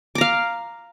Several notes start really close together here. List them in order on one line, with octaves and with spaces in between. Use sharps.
D6 A#5 F5